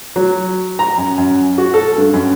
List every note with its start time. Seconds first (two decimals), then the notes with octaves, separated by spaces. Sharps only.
0.16 F#3
0.79 A#5
0.98 F#2
1.18 F#2
1.58 F#4
1.74 A4
1.98 G2
2.14 F#2